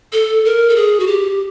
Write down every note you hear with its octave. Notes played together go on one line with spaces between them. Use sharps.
A4
A#4
A4
G#4
F#4
G4